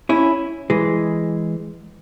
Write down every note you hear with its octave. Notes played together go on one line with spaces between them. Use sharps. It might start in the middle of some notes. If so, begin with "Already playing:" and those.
C#4 E4
E3 G#3